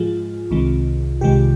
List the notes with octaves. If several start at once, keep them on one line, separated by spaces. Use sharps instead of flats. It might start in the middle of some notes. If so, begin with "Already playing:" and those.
Already playing: G#2 F3 G#3 F4
C2 C3 D#3 G#3
C2 C3 D#3 G#3 G4